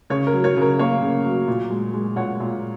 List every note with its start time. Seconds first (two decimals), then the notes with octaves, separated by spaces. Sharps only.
0.10 C#3 C#5
0.27 A#4
0.33 F#3
0.44 C#5
0.56 C#3 A#4
0.79 A#3 C#5
1.02 C#3
1.24 F#3
1.48 A#2
1.70 G#3
1.94 G#3
2.16 A#2 C#5 F#5
2.40 A#2